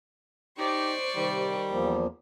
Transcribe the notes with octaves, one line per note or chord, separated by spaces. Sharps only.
D#4 G4 C5 D5 C#6
C3 D#3 G3
E2 F3 A#3